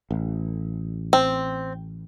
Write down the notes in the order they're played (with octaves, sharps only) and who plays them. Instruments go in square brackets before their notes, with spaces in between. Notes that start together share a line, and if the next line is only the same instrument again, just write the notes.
[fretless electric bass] A1
[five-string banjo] C4